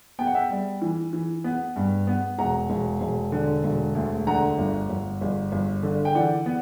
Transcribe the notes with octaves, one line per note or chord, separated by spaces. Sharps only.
B3 G5
F#5
E5 G5
G3
E3
E3
B3
G2
B3
E1 F#5 A#5
E1
E1
D3
E1
D2
D3 F#5 A#5
G1
G1
G1
G1
D3
G5
E3 D5 F#5
B3